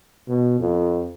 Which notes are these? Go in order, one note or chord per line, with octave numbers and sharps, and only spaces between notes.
B2
F2